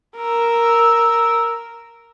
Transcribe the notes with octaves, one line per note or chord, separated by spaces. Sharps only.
A#4 E6